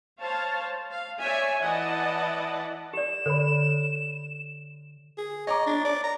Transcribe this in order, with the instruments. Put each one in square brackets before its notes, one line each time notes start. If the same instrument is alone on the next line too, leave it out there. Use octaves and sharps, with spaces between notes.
[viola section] C5 C#5 F5 A5
F5
C#5 D5 E5 G#5
E3 E4 D5 D#5 F#5 A5
[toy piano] G4 D5 [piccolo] E7
[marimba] D3 [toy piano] A4 C#5 B5
[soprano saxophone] G#4
[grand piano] C#5 A#5 D6 [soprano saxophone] D#5
[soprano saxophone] D4
D5
A#5